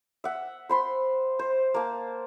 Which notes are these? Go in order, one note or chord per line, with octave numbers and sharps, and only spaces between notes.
E5 F#5
C5 B5 C6
C5
A#3 A5